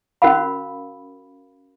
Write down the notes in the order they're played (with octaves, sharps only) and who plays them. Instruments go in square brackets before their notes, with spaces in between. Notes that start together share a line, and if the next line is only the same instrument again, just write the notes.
[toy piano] C#4 F#4 A#4 F5 B5